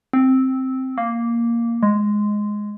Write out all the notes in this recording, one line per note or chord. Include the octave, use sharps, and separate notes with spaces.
C4
A#3
G#3